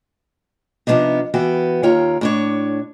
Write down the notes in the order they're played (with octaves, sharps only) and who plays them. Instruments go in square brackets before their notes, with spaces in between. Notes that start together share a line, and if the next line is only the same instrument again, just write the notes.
[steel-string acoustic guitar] C3 F3 A3 B3 D4 D#4
E3 B3 F#4 G5
D#2 F4 C#5 G5 A#5
A2 D4 C#5